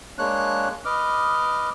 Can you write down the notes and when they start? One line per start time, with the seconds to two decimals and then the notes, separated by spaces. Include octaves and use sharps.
0.18 G#3 A#3 D4 C#5 F#6
0.85 B4 D#5 D6 F6